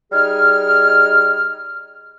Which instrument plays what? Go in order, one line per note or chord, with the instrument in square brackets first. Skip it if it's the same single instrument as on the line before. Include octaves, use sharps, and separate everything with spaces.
[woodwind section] G3 D#4 G#4 F6